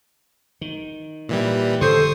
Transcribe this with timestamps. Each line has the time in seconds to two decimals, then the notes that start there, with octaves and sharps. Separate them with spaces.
0.61 D#3
1.29 A#2 E3 G3
1.81 D3 E3 G3 A4 C5 C#6 D#6 C7